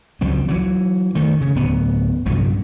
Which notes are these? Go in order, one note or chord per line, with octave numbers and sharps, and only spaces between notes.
C#2 F3 F#3 C4
E3 F#3
D#3 A3
C#3
D1 B3
C2 G2 A#2 F#3